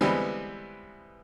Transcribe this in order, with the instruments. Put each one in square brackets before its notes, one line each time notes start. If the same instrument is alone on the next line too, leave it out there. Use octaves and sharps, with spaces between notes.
[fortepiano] D3 E3 G3 G#3 B3 C4